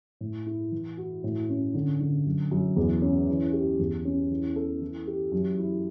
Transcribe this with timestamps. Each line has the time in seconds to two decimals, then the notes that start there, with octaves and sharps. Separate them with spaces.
0.21 A2
0.47 E4
0.72 E3
0.97 F#4
1.24 A2
1.49 C#4
1.74 D3
2.00 D3
2.26 F#2
2.51 F#2
2.76 E2
3.02 C#4
3.28 E3
3.53 G4
3.79 E2
4.05 C#4
4.31 E3
4.56 A4
4.81 E3
5.08 G4
5.32 F#2
5.58 E4